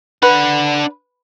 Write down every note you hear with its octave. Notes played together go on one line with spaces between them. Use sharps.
D4 B4 F#5